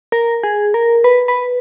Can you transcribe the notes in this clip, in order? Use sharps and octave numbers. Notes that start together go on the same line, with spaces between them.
A#4
G#4
A#4
B4
B4